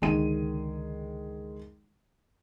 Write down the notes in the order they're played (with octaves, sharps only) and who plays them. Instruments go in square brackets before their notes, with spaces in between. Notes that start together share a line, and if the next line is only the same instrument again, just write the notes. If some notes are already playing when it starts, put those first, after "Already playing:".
[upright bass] C#2 D3 [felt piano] D#3 G#3 D#7